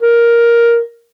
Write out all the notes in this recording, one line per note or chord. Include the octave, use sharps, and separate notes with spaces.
A#4